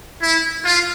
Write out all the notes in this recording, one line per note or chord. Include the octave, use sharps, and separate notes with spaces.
E4
F4